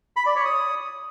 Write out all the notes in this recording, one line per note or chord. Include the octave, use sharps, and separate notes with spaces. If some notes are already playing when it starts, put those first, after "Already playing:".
B5
D5
C#5
D#6